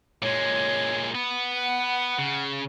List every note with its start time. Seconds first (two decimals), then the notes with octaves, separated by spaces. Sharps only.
0.22 A#2 G#3 C#5
1.15 B3
1.54 F#5
2.19 C#3